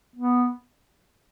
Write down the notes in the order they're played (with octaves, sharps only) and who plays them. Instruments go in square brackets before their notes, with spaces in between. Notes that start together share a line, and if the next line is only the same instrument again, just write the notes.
[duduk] B3